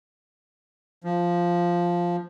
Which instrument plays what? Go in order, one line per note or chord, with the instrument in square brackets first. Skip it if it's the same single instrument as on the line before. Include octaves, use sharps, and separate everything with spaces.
[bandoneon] F3